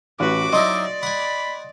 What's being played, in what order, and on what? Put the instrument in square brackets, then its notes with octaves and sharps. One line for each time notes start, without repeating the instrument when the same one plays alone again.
[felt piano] A1 [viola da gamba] F#4 B4 [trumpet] D6
[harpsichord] F#3 D#4 E4 [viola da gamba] D5 [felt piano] D#5 C6
[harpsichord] F#5 G#5 [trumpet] B5